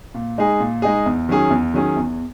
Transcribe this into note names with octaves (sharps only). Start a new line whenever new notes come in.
A#2
G#3 D#4 G#4
A#2
G#3 D#4 G#4
E2
D#3 F#3 C#4 G#4
E2
D#3 F#3 C#4 G#4
E2